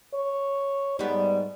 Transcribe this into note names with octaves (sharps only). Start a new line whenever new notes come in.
C#5
G#2 G3 B3